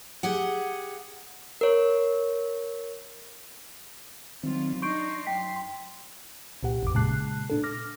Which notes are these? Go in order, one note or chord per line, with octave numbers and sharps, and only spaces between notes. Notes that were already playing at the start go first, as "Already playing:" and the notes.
G4 G#4 F#5
A#4 C#5
D#3 F#3 G3 C4 F4
D4 D#4 C6 C#6 G6 D7
F#2 G5 B6
C2 A#2 G4 F#5
A1 F2 D6
A#2 C#3 G#3 A5 F#6 C7
A#2 D4 A4
D6 F6 A#6